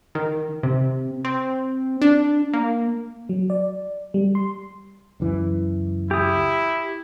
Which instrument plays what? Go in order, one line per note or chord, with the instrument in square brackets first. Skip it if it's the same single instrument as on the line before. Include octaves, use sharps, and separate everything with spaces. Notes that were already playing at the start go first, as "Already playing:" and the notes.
[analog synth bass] D#3
C3
C4
D4
A#3
[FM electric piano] F#3
D5
G3
C6
[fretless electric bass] C#2 F#2 E3
[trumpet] E4 [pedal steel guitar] G4 D#6